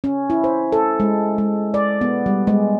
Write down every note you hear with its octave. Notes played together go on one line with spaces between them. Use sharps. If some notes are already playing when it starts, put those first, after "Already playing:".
C#4
E4
C5
A4
G#3
G#3
D5
B3
G3
G#3